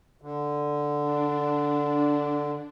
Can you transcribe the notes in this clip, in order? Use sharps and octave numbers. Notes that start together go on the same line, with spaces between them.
D3
D4